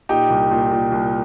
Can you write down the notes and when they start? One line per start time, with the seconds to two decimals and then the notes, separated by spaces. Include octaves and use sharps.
0.09 A#2 D#4 G4
0.30 C2
0.51 A#2
0.71 A#2
0.92 C2